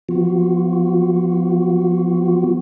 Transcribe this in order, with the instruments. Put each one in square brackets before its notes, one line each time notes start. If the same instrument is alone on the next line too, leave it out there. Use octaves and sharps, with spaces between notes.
[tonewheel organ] F3 B3 F4 F#4